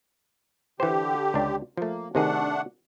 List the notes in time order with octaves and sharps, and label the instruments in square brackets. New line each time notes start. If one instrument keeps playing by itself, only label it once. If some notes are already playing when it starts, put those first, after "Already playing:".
[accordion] D3 G4 [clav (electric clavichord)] E3 C5
[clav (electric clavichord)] C#2 D4
[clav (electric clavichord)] F3 A3 [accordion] A#3
[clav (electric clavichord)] C3 D#3 G#4 [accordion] A3 D4 F#5